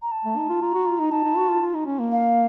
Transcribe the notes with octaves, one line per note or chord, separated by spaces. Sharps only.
A#5
A5
A3
D#4
F4
F4 A#5
F#4
F4
D#4
D#4 A5
D#4
F#4
F4
F4
D#4
C#4
A#3
F5